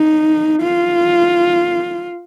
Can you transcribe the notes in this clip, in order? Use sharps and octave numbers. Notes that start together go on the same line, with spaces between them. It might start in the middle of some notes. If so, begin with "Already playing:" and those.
Already playing: D#4
F4